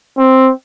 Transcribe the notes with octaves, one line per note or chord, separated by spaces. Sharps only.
C4